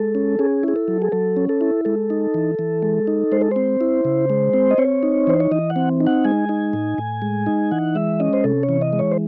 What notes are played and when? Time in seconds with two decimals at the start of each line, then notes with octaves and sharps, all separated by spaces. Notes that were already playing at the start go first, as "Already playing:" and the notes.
Already playing: G#3 A4
0.15 C#4
0.39 C#4 G#4
0.63 E4 G#4
0.76 A4
0.88 F#3
1.02 G#4
1.12 F#3 A4
1.37 C#4
1.49 A4
1.61 E4
1.85 G#3 A4
2.10 D#4
2.34 E3
2.59 E3
2.83 G#3
3.07 D#4
3.32 G#3 C5
3.41 A4
3.51 C4 C5
3.81 E4
4.05 C#3
4.30 G#3
4.54 C4
4.71 D#5
4.78 C4 C#5
5.03 D#4
5.27 E3 C5
5.40 C#5
5.51 E3 D#5
5.70 F#5
5.76 C4
6.00 D#4
6.07 F#5
6.25 G#3 G#5
6.49 D#4
6.73 A2
6.98 A2
7.22 G#3
7.46 D#4
7.71 E3 F#5
7.95 G#3 E5
8.20 C#4 D#5
8.33 C5
8.44 C3 A4
8.63 C#5
8.69 E3
8.81 D#5
8.93 G#3
8.99 C#5
9.12 C5